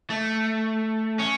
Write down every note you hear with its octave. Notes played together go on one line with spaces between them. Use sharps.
A3
C#4